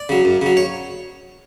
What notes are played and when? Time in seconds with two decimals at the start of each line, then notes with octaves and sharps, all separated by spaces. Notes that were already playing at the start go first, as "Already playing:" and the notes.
Already playing: D5
0.09 C#3 F#3
0.25 F#2
0.41 C#3 F#3
0.57 C#5